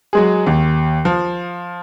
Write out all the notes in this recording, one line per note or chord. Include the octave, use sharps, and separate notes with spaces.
F#3 G#3 G#4
D#2
F3